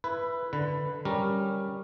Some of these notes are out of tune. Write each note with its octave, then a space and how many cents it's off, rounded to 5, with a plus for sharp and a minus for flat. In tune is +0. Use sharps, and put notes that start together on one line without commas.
E4 +15 B4 +0
D3 +0 B4 +0
G3 +0 C#4 -10 A#4 +0